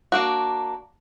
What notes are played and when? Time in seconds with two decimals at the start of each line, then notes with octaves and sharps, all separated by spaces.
0.12 A#3 D4 F#4